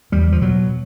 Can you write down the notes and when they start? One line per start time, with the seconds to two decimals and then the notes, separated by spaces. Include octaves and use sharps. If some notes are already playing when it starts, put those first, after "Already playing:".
0.12 E2 G3
0.32 F3
0.42 B2 F#3